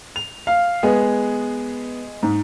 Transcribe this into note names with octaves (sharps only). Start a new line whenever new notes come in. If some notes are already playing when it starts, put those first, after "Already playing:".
F7
F5
G#3 B3 G#4
G#2